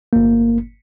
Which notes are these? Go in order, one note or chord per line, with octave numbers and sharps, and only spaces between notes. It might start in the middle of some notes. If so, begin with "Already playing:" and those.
G1 A#3